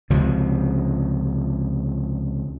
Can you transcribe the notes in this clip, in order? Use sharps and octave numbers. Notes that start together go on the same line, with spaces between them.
C#2 C3 F3